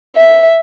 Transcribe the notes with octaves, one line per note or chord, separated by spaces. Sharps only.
E5